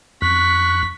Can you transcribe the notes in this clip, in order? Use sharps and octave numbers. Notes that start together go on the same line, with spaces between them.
F2 C#6 F#6 B6